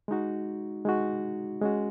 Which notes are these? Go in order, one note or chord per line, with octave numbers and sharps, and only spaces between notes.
G#3 D#4 F#4
G#3 D#4 F#4
G#3 C#4 F#4